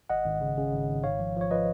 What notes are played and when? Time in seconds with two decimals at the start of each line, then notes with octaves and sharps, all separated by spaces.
0.10 G#1 D#5 F#5
0.25 G#1
0.41 C#3
0.58 C#3
0.73 G#1
0.89 G#1
1.04 G#2 C#5 F5
1.20 F3
1.36 F3 C#5
1.51 F3 B4 D#5